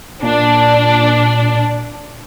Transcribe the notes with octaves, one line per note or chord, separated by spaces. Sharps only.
A#2 D4